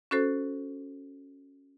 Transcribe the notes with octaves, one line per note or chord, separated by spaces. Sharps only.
C#4 F#4 A4 C5